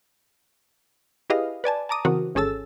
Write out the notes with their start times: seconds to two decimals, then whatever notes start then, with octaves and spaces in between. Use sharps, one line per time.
1.30 E4 G4 G#4 B4 D#5 F5
1.64 B4 D5 G#5 A5
1.89 A5 A#5 D6 D#6
2.05 C#3 E3 C4 F#4 A#4
2.35 G#1 C#4 G#4 A4 E6 A6